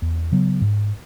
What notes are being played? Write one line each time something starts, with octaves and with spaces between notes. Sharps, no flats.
E2
C#3 F#3 B3
G#2